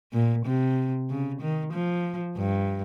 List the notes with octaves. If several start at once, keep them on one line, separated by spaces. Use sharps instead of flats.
A#2
C3
C#3
D#3
F3
G2